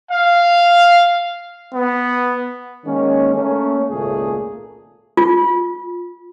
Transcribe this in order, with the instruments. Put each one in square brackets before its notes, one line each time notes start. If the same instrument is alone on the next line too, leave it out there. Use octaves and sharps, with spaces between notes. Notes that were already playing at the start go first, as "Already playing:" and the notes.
[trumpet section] F5
[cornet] B3
[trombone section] D#3 G#3 A#3 C#4
A3 A#3 C#4
G#1 C#2 A#2 A3 A#3 G#4
[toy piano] F4